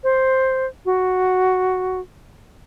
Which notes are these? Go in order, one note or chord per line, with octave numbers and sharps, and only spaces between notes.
C5
F#4